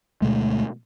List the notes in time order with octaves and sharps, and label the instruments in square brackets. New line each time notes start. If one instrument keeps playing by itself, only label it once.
[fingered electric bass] D2 B2 G#3 A3